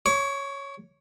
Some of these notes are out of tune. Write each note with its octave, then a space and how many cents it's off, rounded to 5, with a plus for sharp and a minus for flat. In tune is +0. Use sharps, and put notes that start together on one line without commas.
C#5 +0 D6 -40